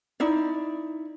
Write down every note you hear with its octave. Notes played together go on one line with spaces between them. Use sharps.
D#4 E4 D5